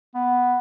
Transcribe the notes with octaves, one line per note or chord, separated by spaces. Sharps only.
B3